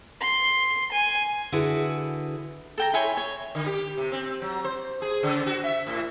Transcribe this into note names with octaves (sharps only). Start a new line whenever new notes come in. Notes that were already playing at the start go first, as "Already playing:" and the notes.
C6
G#5
D3 E4 F#4 G#4 B4
A4 G5 A#5
E4 C#5 G#5 C6
C#5
D3
G4
C3
C4
F#3
C5
G#4
C#3
F#4
E5
A2